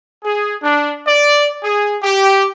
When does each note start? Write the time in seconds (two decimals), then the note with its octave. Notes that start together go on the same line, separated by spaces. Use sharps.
0.24 G#4
0.62 D4
1.07 D5
1.64 G#4
2.03 G4